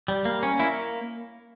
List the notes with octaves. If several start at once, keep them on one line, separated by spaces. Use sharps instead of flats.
G3
A#3
C#4
A#3 E4